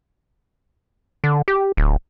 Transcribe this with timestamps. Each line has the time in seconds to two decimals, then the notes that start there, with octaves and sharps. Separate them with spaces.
1.24 D3
1.48 G4
1.77 D1